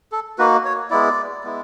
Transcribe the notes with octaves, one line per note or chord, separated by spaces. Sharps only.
A4
A#3 D#4 F#4 B4
C#5
G#3 B3 E4 D5
G#3 B3 E4